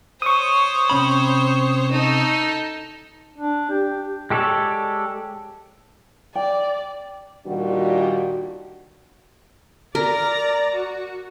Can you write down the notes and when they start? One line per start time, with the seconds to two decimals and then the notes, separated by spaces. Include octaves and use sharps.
0.22 C5 C#5 C#6 D#6
0.90 C3 C#4 B5
1.92 D#4 A4
3.38 D4
3.70 G4
4.30 G#3 G4 A4 C#5 D5
6.35 D5 G5
7.47 A#2 D#3 G3 D4 F#4
9.95 A#4 D5 A#5
10.74 F#4